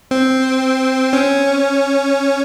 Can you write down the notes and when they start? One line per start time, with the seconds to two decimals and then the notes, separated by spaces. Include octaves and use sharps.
0.11 C4
1.13 C#4